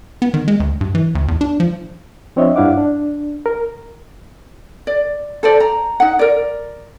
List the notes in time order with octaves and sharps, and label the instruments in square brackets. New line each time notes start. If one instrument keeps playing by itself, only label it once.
[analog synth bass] B3
D#3
G#3
D2
G2
E3
D2
E2
D4
F3
[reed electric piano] F3 C4 D4 C#5 D#5 E5
G2 D4 E4 F5 F#5 D6
D4
A#4
[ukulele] D5
A4 C5 D5
A#5
D#4 F#5
A#4 D5